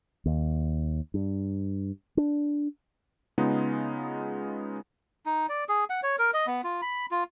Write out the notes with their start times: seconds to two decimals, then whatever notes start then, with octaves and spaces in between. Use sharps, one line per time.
0.26 D#2
1.14 G2
2.17 D4
3.38 C#3 G#3 B3 D#4 F4 G#4
5.26 D#4
5.49 D5
5.69 G#4
5.90 F#5
6.03 C#5
6.19 A#4
6.34 D#5
6.47 B3
6.64 F4
6.82 B5
7.11 F4